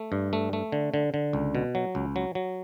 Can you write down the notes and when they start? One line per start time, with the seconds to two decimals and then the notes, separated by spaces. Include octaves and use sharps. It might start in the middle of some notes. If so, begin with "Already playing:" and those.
Already playing: A3
0.12 G2
0.33 A3
0.53 A3
0.72 D3
0.94 D3
1.14 D3
1.33 C#2
1.55 B2
1.75 F#3
1.95 C#2
2.16 F#3
2.35 F#3